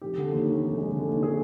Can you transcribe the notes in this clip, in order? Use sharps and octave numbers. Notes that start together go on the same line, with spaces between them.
F1 G4
D3
D#2
D#2
F1
G#3
D3
D#2
D3 G#4